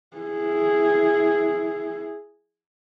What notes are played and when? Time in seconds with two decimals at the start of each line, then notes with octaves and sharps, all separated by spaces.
0.17 E4 G#4